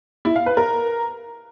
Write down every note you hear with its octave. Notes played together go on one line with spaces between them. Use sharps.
E4
F5
B4
A#4